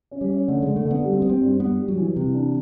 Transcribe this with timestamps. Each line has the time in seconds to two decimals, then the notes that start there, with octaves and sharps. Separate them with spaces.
0.11 C#4
0.21 G3
0.30 C#4
0.48 D3 A3
0.63 D3 G#3
0.76 A3
0.85 D3
0.91 B3
1.04 G3
1.13 C4
1.22 G3 B3
1.29 C4
1.41 G2
1.60 G2 B3
1.79 G3
1.88 F#3
1.97 E3
2.16 C3 E3
2.34 D4